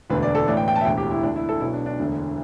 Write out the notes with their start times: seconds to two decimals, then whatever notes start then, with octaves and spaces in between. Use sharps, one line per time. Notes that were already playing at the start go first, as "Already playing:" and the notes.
0.10 E1 D2 D3 B4
0.23 D5
0.35 A4
0.47 A1 A2 E3 D5
0.57 G5
0.68 G5
0.75 A5
0.81 E5
0.85 E1 D2 D3 G5
0.98 G4
1.11 E4
1.23 D2 D4
1.27 D3
1.36 E4
1.49 A4
1.60 B1 B2 E4
1.73 D4
1.86 D4
1.99 E1 D2 D3